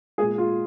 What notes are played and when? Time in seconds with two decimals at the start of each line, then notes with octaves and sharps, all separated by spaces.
0.18 A#2 G#3 G#4
0.38 F4